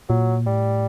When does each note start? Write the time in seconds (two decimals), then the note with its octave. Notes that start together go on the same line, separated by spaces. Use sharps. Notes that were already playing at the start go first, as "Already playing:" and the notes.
0.09 A#2 F#3
0.47 A2 G3